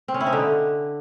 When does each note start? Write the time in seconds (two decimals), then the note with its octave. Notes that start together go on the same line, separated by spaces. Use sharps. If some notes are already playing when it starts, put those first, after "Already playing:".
0.08 C4
0.14 C#4
0.20 E4
0.27 D#4
0.33 D3